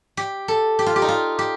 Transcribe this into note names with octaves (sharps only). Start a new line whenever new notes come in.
G4
A4
G4
F4
G4
D#4
F4
G4